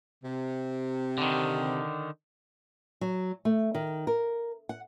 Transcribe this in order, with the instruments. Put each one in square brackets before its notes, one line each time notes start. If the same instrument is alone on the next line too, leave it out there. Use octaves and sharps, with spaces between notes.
[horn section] C3
[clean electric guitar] D3 D#3
[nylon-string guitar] F#3
A3
D#3
A#4
F#5